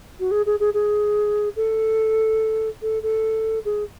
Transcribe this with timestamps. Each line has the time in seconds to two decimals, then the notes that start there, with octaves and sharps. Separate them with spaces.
0.20 F#4
0.31 G#4
0.46 G#4
0.60 G#4
0.74 G#4
1.56 A4
2.82 A4
3.03 A4
3.65 G#4